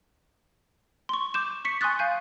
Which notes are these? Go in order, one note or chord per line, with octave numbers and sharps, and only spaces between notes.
C6 C#6
D6 G6 E7
C#6 B6 C#7
G#5 C6 C#6 D#6 F#6 A6
F5 G#5 G6